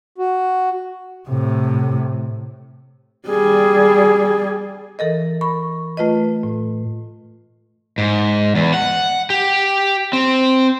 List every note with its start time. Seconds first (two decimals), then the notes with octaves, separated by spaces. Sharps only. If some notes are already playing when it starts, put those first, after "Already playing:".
0.18 F#4
1.29 A2 C3
3.28 G3 G#4
4.99 E3 A4 A#4 D#5
5.41 A#4 B5 C#6
5.97 A3 F4 B4 D#5
6.43 A2
7.98 G#2
8.55 E2
8.74 F#5
9.30 G4
10.13 C4